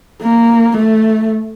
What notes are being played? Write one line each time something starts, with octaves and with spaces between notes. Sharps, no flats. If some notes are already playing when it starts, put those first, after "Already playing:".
A#3
A3